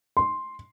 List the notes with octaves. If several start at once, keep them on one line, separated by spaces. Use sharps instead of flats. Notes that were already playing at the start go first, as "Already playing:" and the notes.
C6